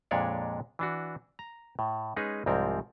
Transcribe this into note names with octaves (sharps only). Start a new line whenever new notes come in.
F2 A#2 G#3 D4 C#5 D5
E3 D4 F#4
A#5
A2
G#3 C#4 D#4 G#4 B4
C2 G#2 F3 C4 A#4